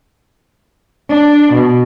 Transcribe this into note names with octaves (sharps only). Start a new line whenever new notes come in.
D4
B2